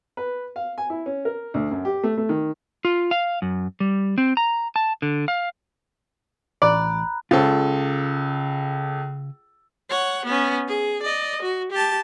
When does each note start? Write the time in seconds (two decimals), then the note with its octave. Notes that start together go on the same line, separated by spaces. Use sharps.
0.17 B4
0.56 F5
0.78 G#5
0.90 E4
1.06 C#4
1.25 A#4
1.54 D2
1.71 F#2
1.85 G4
2.03 A3
2.18 A3
2.29 D#3
2.85 F4
3.11 F5
3.42 F#2
3.80 G3
4.18 C4
4.37 A#5
4.76 A5
5.02 D3
5.28 F5
6.62 A1 D5 A#5 B5 F#6
7.31 C#2 C#3 F4 A4
9.90 C#5 F#5
10.25 B3 C#4
10.68 G#4
11.02 D5 D#5
11.42 F#4
11.72 G4 A5